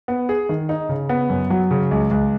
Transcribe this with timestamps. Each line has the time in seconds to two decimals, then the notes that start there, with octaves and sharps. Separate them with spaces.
0.08 B3
0.29 G#4
0.49 D#3
0.69 D#4
0.89 C#3
1.09 B3
1.30 F#2
1.50 F#3
1.71 C#3
1.91 C#2
2.11 C#2